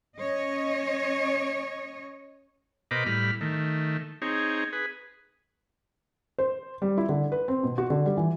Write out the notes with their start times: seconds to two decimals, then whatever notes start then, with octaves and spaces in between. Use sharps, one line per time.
0.17 C#4 C#5 D#5
2.91 B2 A#4 C5 D#5 B5 D6
3.06 A2 G3 B5 F6
3.41 D#3 A3
4.22 C4 D#4 G#4 C#5
4.73 G#4 B4
6.39 C5
6.82 G3
6.98 E4
7.09 D3
7.32 B4
7.48 C4
7.63 B2
7.78 F#4
7.90 D3
8.06 G3
8.17 E3